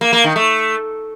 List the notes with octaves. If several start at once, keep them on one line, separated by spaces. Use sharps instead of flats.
A#3
A#3
D#3
A3